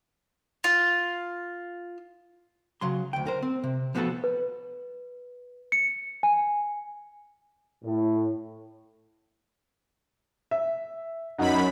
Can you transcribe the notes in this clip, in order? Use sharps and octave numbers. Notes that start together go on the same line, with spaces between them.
F4
C#3 F#3 C6
D2 G5
A#4 C5
C4
C3
F3 B3 F#4 G4 A4 B4
B4
C#7
G#5
A2
E5
F#2 D#4 F#5 B5